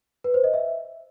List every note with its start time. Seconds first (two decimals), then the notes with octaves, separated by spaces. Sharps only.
0.24 B4
0.34 C5
0.44 D#5
0.54 E5